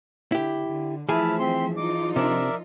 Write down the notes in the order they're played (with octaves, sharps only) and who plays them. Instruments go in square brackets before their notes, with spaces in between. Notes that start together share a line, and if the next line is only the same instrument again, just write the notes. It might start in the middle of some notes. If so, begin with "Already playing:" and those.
[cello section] D3 [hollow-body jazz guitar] E4 G4
[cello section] D3
[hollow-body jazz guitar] E3 G#4 [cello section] F3 A3 E5 [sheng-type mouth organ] E4 A5 F6
[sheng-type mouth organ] C4 C6
[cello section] F3 D#4 F4 [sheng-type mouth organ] D6
[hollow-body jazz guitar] C3 D4 [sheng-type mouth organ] A#4 D5 E5